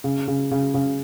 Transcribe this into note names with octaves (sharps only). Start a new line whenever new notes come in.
C#3
C#3
C#3
C#3